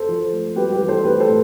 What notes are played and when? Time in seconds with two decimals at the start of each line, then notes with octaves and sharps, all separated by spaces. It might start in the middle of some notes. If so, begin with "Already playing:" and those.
Already playing: A4 C5
0.08 F3
0.32 A3
0.56 G3 G4 B4
0.72 G4 B4
0.80 E3
0.88 A4 C5
1.04 A3 G4 B4
1.20 A4 C5
1.28 A2